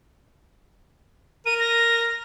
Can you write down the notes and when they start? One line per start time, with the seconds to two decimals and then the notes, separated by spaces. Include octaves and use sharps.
1.46 A#4 D#7
1.60 A#6